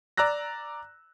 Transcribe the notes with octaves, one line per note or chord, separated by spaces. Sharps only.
D5 A#5 E6 F#6 A#6